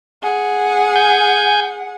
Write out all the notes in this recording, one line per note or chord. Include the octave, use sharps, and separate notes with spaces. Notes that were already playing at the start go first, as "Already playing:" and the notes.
G#4 F#5
G#5 G6